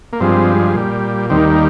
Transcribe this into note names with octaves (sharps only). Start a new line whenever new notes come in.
A#3
G2 F3 G#3 C4
A#2 G3
D#2 D#3 G3 C4
A#3
A#3